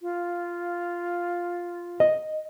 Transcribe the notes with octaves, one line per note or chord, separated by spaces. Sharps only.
F4
D#5